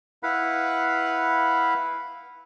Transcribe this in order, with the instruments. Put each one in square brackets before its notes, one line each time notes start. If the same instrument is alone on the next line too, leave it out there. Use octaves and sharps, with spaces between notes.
[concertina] E4 B4 F5 F#5 B5